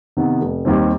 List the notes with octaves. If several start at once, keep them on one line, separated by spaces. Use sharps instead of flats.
C3 D#3 B3
F1
D#2 D#3 G3 C4